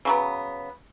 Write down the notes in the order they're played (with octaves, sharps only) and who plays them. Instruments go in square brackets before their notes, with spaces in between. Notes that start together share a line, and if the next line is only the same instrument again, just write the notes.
[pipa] C#3 F#3 B3